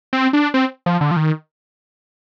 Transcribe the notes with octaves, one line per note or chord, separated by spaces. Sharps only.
C4
D4
C4
F3
D3
F3
D#3